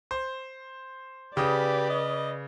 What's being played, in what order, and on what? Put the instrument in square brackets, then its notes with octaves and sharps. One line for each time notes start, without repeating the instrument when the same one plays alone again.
[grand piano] C5
[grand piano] C#3 D#6 [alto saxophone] G4 [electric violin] B4 D5
[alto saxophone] D#5